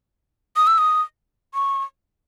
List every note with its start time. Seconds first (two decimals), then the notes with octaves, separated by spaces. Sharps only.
0.57 D#6
0.67 E6
0.78 D#6
1.55 C#6